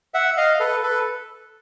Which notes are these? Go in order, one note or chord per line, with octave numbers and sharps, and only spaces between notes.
E5 F#5
D#5 F5
A4 B4
A4 B4